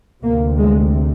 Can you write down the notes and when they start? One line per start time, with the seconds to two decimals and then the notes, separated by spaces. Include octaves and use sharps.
0.23 D2 C3 A#3
0.57 G#3